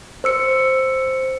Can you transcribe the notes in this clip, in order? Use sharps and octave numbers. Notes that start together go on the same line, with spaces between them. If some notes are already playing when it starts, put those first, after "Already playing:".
C5 E6 C#7